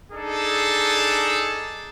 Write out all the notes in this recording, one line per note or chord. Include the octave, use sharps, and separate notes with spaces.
D4 D#4 G#4 A4